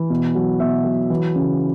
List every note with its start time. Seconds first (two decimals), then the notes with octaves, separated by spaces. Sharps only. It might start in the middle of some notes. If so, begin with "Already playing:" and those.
Already playing: E3
0.10 B2
0.35 F#3
0.60 B2 E5
0.85 F#3
1.10 E3
1.35 C#3